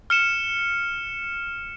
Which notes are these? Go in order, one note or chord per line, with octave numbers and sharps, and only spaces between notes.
F6 C#7 E7